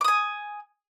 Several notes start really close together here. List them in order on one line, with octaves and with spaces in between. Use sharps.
D6 D#6 G#5